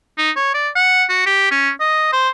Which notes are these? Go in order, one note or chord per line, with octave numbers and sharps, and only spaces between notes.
D#4
C#5
D5
F#5
F#4
G4
C#4
D#5
C5